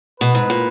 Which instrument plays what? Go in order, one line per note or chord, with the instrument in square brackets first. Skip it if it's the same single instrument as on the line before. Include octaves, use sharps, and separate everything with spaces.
[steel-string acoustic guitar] B2 [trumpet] B4
[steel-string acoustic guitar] G#2
A#2